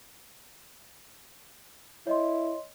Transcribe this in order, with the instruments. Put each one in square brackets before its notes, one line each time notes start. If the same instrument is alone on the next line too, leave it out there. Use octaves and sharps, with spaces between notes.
[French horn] E4 [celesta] C#5 D#5 C6